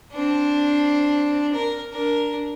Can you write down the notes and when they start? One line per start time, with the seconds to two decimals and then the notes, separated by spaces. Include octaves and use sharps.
0.13 C4 D4
1.54 A#4
1.92 D4 A#4